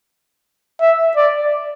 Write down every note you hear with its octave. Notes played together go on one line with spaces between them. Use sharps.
E5
D5